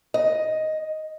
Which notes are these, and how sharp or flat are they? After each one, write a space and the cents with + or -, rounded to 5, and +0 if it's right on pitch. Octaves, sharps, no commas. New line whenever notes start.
D#5 +5